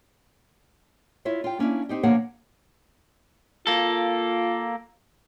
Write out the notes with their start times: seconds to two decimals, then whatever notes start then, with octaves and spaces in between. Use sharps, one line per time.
1.25 E4 F4 C#5 E5
1.44 F4 G5
1.59 A#3 C#4 D4 E4
1.89 C4 D#4 G4
2.03 B2 D3 F3 A#3 C#5 F#5
3.67 A#3 F4 A4